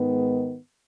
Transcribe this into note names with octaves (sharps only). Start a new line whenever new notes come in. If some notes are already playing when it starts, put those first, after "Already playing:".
Already playing: G#2 D#3 G#3 B3